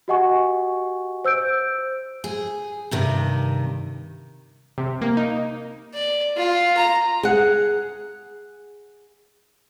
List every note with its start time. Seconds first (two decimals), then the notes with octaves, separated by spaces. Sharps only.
0.08 F#4 G4 D#5 F#5 G#5 C#6
1.25 C5 E6 G6 D7
2.24 G#4
2.91 G2 C3 D#3
4.78 C3
5.02 A#3
5.17 D#4
5.94 D5
6.37 F4
6.77 A#5
7.23 G#4 F#5